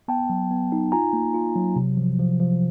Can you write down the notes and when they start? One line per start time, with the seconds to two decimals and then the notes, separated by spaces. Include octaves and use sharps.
0.08 B3 G5 A5
0.30 F#3
0.51 B3
0.72 D#4
0.92 F4 G#5 A#5
1.13 A#3
1.34 F4
1.56 F#3
1.76 C3
1.97 F3
2.19 F3
2.40 F3